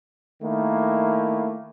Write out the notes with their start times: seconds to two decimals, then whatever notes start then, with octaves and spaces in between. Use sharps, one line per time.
0.43 D#3 A3 A#3 E4